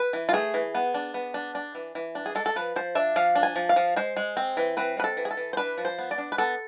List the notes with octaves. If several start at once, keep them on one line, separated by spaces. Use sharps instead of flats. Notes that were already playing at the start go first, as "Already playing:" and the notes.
Already playing: B4
E3
F4
A3 G#4
E3
B3
D4
B3
D4
D4
E3
E3
D4
G#4
G#3 A4
A4
F3 B4
F3 C5
D4 E5
F3 F5
D4
G#5
F3
F5
F3
G#3 C5
G#3
C4
E3
C4 B4
G#3 B4
A4
E3
G#4
A4
E3
C5
D4 B4
F3
C5
B3
D5
D4
B4
B3 A4